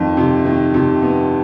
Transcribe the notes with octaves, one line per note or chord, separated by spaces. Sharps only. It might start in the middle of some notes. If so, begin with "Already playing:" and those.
Already playing: F2 D#3
C3
D#3
C3
B3